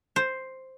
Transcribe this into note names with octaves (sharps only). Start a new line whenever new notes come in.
C5